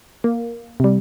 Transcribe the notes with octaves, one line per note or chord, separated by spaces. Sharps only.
A#3
C3 G3